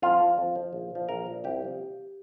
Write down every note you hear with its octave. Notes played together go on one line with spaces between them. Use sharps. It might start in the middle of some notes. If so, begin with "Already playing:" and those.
F2 F4
F3
F2
F3
A#1
A#2 F3
A#1 A#4
A#2 F3
C2 G4
C3 F3